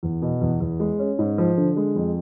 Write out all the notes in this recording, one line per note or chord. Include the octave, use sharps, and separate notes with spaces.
E2
B2
E2
E2
G#3
C#4
G#2
F3
D3
G#3
F2